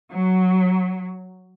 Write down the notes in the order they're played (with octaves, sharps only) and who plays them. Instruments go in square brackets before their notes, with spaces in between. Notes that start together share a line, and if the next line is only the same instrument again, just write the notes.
[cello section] F#3